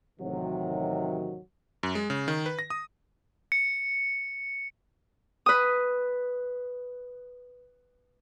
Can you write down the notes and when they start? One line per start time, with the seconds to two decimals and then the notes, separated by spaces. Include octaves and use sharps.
0.20 A1 C3 D#3 F#3
1.83 F#2
1.95 G#3
2.10 C#3
2.28 D#3
2.46 B4
2.59 A#6
2.70 D#6
3.52 C#7
5.46 B4 D#6